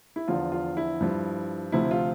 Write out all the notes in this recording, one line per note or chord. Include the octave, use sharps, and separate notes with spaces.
E4
E2 D3 F3 F4
F4
E4
G2 F3
D2 C3 F3 E4
F4